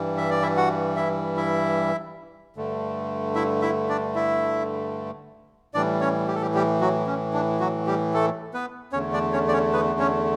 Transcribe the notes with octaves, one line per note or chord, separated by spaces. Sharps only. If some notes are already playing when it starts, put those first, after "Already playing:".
Already playing: G2 E3 G3
E5
D5
E4 E5
F#4 F#5
E4 E5
E4 E5
G2 D3 A3
E4 E5
E4 E5
D4 D5
E4 E5
A2 E3 G3 D4 D5
C#4 C#5
G4
A4
G3 G4
G3 G4
F#3 F#4
C#4
D4
F#3 F#4
G3 G4
A3 A4
B3 B4
E2 D3 A3 C#4 C#5
D4 D5
C#4 C#5
D5
C#4 C#5
B3 B4
C#4 C#5